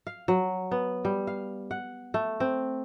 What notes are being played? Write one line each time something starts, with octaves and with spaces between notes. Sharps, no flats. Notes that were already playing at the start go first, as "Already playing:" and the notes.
F5
F#3
B3
G3
F5
F#5
A3
C4